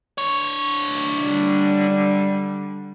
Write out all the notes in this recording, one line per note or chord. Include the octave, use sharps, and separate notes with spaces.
D4 C#5
D3 G3